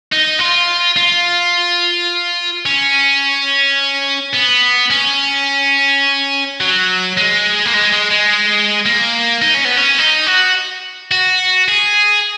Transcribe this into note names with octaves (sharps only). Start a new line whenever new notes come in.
D#4
F4
F4
C#4
B3
C#4
F#3
G#3
A#3
G#3
G#3
G#3
A#3
D#4
C#4
B3
C#4
D#4
F#4
F#4
G#4